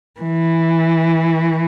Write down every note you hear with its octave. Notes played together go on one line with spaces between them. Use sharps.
E3